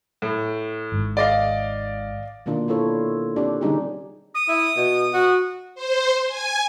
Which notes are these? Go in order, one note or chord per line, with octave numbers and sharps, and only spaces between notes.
A2
G#1 G#2
D5 D#5 F5
B2 D#3 A#3 D4 F4
E4 F4 A4 C#5
C4 D4 G4
D3 G3 C#4 D#4 G4 G#4
D#6
E4
B2
F#4
C5
G#5